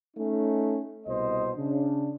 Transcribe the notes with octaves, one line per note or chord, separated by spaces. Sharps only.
A3 C#4 D#4
C2 B2 C5 D#5
C#3 D4